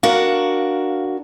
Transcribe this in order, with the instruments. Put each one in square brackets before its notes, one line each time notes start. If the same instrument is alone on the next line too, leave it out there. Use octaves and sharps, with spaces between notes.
[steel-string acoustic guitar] D4 F#4 A#4 [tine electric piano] F5